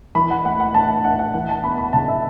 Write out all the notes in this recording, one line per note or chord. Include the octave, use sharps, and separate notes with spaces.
E3 B5
F#5
A3 F#5
F#5
A2 A5
A2 F#5
F#5
E3 F#5
A5
B3 B5
B5
C#3 A5
E5